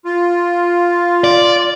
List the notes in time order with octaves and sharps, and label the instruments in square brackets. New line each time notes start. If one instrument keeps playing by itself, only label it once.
[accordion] F4
[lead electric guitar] D5